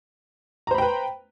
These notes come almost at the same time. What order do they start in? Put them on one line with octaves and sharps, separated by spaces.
A#5 C5 B5 G5 B4